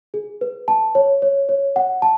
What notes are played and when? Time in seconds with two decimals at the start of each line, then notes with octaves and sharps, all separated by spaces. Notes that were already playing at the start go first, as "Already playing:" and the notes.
0.14 G#4
0.41 B4
0.68 A5
0.95 C#5
1.22 C#5
1.49 C#5
1.76 F#5
2.02 A5